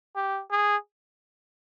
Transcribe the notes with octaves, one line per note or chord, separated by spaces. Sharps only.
G4
G#4